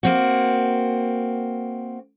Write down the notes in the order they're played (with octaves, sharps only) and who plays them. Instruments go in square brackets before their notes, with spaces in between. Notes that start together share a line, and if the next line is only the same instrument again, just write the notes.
[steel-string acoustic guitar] A#3 C4 F#4